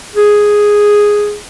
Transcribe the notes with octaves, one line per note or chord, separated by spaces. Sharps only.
G#4